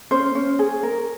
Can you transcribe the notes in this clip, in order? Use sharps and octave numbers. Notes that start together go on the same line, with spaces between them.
C#4 C5
C#4
G#4
A#4